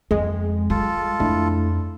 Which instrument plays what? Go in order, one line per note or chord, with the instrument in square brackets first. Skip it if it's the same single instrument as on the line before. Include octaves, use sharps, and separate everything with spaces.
[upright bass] F2 [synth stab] G#3
[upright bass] G3 [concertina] F4 A4
[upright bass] F2 [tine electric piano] A3 D4 E4